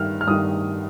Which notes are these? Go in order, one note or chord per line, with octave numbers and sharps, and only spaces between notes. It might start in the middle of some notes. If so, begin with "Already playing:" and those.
Already playing: G2 D#3 F6
F6
G2 D#3 D#6